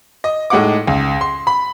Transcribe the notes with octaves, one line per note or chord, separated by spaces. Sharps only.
D#5
A2 G#3 D#4 F#5 D6
C#2
C6
B5